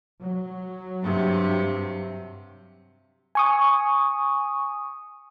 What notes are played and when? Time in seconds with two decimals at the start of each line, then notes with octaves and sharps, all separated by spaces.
0.21 F#3
1.02 G2 C3
3.35 G#5 C#6 D#6